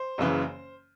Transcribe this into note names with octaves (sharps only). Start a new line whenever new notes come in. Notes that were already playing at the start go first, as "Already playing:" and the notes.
Already playing: C5
F#1 F#2 C#3 E3